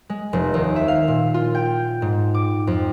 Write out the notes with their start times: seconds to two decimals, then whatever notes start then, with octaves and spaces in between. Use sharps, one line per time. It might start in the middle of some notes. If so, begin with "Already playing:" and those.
0.10 G#3
0.33 F1
0.54 D#2
0.76 E5
0.88 F5
1.08 A#2
1.34 F4
1.55 G5
2.02 G#2
2.34 D6
2.67 F2